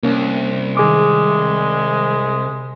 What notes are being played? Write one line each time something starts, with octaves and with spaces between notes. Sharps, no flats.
C2 A#3 C#4
D#3 G#3 G#4 D6